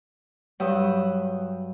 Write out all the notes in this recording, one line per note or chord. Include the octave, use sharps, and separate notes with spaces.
G2 F#3 B4 G5 D#6 E6